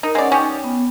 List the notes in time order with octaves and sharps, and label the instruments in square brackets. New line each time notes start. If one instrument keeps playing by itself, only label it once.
[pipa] D#4 [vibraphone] A#4
[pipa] G#3 D5 [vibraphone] C#4 C#5 F#5
[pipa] C#4 G4 [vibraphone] D#4
[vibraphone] B3